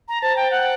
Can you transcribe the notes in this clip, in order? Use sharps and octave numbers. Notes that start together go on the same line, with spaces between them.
A#5
C5 A5
G5
F#5